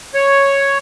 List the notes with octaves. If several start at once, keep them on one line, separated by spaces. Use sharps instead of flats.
C#5